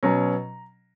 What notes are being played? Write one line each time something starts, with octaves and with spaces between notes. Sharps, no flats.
B2 F#3 C#4 A#5